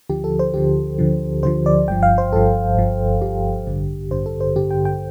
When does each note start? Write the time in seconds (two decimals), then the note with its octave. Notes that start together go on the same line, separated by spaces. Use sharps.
0.09 D2 D3 F3 G4
0.24 A4
0.39 C5
0.54 D2 D3 F3 G4
0.99 D2 D3 F3
1.43 D2 D3 F3 C5
1.66 D5
1.88 G1 G2 F3 G5
2.03 F5
2.18 C5
2.33 G1 G2 F3 A4
2.77 G1 G2 F3
3.21 G1 G2 F3 G4
3.67 A1 G2 D3
4.11 A1 G2 D3 C5
4.26 A4
4.41 C5
4.56 A1 G2 D3 G4
4.71 G5
4.85 G5